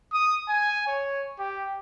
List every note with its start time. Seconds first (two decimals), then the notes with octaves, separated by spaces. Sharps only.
0.13 D#6
0.49 G#5
0.87 C#5
1.39 G4